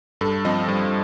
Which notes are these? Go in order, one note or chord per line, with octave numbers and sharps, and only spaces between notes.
G2 A4
F3 C4 D#5
G2